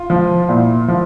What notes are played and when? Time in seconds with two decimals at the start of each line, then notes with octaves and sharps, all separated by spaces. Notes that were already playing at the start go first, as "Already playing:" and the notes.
Already playing: F4
0.10 F3
0.49 A#2 E4
0.88 F3